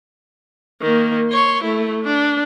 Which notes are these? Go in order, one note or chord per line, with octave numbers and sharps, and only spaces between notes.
D#3 A#3
C#5 C6
A3 E4
D4